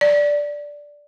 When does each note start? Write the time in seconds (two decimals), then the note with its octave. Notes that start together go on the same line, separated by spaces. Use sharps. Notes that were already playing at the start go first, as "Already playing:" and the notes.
0.01 D5